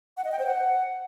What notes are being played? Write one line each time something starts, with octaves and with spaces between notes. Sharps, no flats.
F#5
D#5
G5
C5
F#5